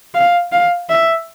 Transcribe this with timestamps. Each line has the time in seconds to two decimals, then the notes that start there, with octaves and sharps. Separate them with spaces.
0.15 F5
0.52 F5
0.89 E5